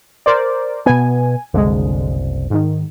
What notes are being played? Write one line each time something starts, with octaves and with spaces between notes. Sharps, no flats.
A#4 C5 D5
B2 B3 G#5
F#1 C2 D3 G#3
G#2 D#3